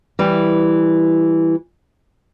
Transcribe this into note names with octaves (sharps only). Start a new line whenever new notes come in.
E3 G3